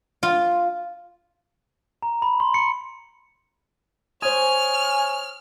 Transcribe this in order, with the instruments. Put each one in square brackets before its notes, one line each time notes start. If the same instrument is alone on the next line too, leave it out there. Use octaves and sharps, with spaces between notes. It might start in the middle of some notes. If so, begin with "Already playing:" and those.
[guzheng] F4
[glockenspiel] A#5
B5
C6
C#7
[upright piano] C5 D#6 [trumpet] C#5 [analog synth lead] G#5 [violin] F6